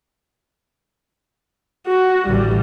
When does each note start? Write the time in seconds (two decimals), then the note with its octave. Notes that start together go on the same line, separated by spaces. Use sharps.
1.87 F#4
2.27 A1 D3 G3